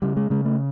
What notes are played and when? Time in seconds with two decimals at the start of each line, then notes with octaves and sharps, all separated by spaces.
0.02 C#3 G3
0.17 G#3
0.30 C#3 G#3
0.45 A3